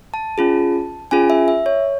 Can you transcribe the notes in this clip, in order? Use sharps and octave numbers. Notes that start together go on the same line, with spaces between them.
A5
C#4 F4 G#4
C#4 F4 G#4 G#5
E5
E5
C#5